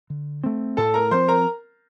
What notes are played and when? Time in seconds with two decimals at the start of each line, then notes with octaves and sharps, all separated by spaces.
0.10 D3
0.44 A3 C4
0.77 A2 A4 A5
0.94 A#4 A#5
1.11 F3 C4 C5 C6
1.28 A#4 A#5